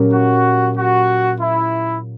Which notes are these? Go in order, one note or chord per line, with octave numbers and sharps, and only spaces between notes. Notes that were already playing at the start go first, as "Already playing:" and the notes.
Already playing: A#2 F#3 C#4 G4 A#4
F#4
F#4
E4